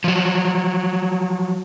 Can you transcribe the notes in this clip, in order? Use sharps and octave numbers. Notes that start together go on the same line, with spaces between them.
F3 F#3